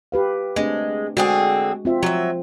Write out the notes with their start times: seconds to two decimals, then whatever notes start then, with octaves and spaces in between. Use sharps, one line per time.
0.12 G4 B4 F5
0.56 G#3 A3 C4 D4
1.17 D3 G#3 C4 F#4 G#4
1.85 C4 F4 E5
2.03 F3 F#3 E5